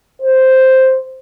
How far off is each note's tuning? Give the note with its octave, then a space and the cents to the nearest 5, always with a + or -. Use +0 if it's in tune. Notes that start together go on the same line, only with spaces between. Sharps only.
C5 +0